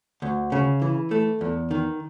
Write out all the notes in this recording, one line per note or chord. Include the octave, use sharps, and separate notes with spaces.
D2
C#3
E3
A3
E2
D#3